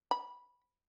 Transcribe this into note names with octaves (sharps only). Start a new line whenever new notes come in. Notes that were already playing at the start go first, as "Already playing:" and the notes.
B5